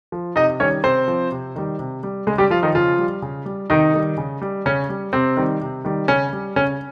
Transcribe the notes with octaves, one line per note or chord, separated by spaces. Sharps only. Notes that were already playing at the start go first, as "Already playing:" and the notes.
F3
C3 D#4 D#5
D#3 G3 C#4 C#5
C3 C4 C5
F3
C3
D#3 G3
C3
G3
C#3 G#3 G#4
G3 G4
F3 F4
D#3 D#4
C#3 F3 F4
G3
C#3
G3
C3 D#3 D#4
D#3 G3
C#3
G3
C#3 C#4
G3
C3 C4
D#3 G3
C3
D#3 G3
C#3 C#4
G3
C#3 C#4